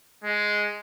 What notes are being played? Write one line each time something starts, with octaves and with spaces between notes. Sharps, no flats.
G#3